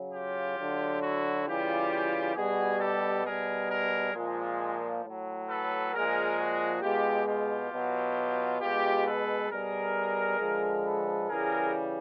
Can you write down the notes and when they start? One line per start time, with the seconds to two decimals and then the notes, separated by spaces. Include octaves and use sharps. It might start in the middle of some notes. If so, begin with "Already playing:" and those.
Already playing: C#3 F#3
0.12 F4 G4
0.57 D3 F#3
1.01 E4 F#4
1.46 C#3 E3 G3 F4 G4
2.35 B2 G3 F#4 G#4
2.80 G4 A4
3.24 B2 G3 G#4 A#4
3.69 G#4 A#4
4.14 A#2 F3 G#3
5.03 A2 F#3
5.48 A4 B4
5.93 A#2 F3 G#3 G#4 A#4
6.37 F#4 G#4
6.82 B2 G#3 F4 G4
7.26 F4 G4
7.71 B2 F#3
8.61 B2 G#3 F4 G4
9.05 A4 B4
9.50 B2 G3 G#4 A#4
10.39 D3 F3 G#3
10.84 A4 B4
11.28 C#3 E3 G3 G#4 A#4